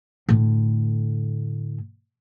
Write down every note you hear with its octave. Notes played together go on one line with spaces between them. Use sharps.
A2 D3